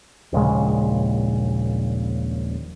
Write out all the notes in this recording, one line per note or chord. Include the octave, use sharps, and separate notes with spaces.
D#1 A#1 C#3 G#3